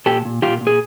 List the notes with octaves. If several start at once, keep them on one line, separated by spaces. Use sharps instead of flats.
A#2 G4 A4
A#2
A#2 F4 G4
A#2
G#4